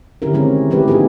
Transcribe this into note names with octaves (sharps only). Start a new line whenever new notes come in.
D3 D#3 C#4 E4 G4 A#4
G#3 A3 C4 C#4 G#4 A#4
F3 A3 E4 G4 B4
B3 D#4 F4 G4 G#4